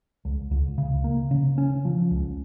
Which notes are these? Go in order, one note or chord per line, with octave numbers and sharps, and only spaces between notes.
C#2
C#2
C#3
A#3
C#3
C#4
F3
C#2